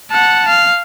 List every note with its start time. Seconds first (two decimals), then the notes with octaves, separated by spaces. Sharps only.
0.11 F#5 A5
0.48 F5